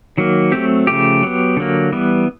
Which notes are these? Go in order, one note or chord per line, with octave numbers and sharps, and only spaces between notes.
D#3 F#3 A#3
F#3 A3 C4 G4
C#3 F3 A3 G4
F#3 B3
D3 F#3 A#3
E3 G3 B3